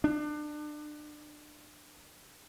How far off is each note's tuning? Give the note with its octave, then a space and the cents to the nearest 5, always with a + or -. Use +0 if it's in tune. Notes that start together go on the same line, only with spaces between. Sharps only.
D4 +30